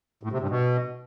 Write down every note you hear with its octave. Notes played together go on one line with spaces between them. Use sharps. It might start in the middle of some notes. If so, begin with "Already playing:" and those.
A2
C3
G2
B2